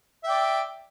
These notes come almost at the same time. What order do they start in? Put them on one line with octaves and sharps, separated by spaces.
E5 G5 D5